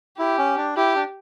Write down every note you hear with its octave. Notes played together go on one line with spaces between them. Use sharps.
E4 G4
C#4
D4
E4 G4
D4